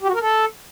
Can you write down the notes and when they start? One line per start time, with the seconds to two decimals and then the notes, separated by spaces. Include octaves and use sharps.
0.01 G4
0.08 F#4
0.14 A#4
0.21 A4